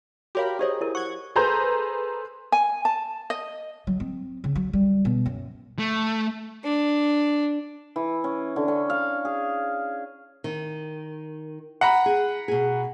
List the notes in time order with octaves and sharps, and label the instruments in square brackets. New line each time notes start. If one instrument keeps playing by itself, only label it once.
[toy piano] F#4 C#5 F5 [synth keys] G4 A#4 B5
[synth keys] D#4 G#4 D#5 [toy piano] G4 C5 C#5
[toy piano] E4 A#4
[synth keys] F#5 G#6 [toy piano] C#6
[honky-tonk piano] G#4 A4 B4 C5 A#5 G6
[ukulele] G#5
A5
D#5
[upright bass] F#3
C4
C#3
F#3
G3
B2
F#2
[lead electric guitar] A3
[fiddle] D4
[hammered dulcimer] E3
C#4
D3
C#4
F5
G#4
[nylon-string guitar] D#3
[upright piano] F#5 A#5 B5
[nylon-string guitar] G#4
B2 G#4